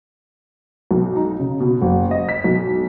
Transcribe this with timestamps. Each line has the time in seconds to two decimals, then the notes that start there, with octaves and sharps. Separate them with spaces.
0.91 B1
1.16 D#4
1.40 C#3
1.60 B2
1.82 F#1
2.11 D#5
2.29 B6
2.44 B1